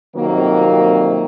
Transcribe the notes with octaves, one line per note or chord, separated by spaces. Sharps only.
F2 C3 D#3 F#3 A#3